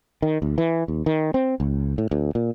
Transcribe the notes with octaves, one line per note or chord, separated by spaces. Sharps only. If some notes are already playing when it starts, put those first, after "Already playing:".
D#3
D2
E3
D#2
D#3
C4
C#2
A2
D2
A#2